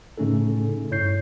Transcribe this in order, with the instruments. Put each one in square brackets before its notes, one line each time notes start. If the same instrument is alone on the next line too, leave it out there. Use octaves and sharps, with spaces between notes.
[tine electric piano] A2 C#3 A3 C#4 D#4 A4
G2 E4 C#5 G6 C7